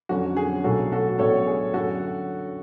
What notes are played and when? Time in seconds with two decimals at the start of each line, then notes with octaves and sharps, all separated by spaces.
0.09 F2 D3 F#3 C#4 F#4
0.37 G#4
0.64 B1 A2 F#3 F#4 A4
0.92 F#4 A4
1.19 A1 A2 F#3 B3 D4 A4 C#5
1.47 G#4
1.74 F#2 D3 F#3 F#4 A4